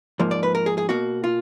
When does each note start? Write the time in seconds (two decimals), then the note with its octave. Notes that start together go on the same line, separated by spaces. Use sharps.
0.19 G#2 F3 A#3
0.31 D5
0.43 B4
0.55 A#4
0.66 G#4
0.78 G#4
0.89 B2 A#3 F#4
1.24 F4